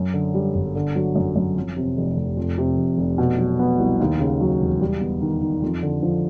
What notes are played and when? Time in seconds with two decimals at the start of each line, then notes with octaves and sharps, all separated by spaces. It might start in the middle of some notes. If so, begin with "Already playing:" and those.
Already playing: F#2
0.14 D3
0.34 G3
0.55 G1
0.75 D3
0.96 F#3
1.16 F#2
1.36 F#2
1.56 F2
1.77 C3
1.97 F1
2.17 F1
2.37 F2
2.58 C3
2.77 F1
2.98 F1
3.18 B2
3.38 F#3
3.59 B3
3.79 C2
4.00 D#2
4.20 C#3
4.41 F#3
4.61 E1
4.81 G3
5.01 B3
5.21 D#3
5.41 D#3
5.62 F2
5.82 D3
6.03 F3